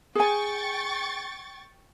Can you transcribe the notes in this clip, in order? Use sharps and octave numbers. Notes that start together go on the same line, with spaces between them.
G#4 G5 G#5 C#6 A6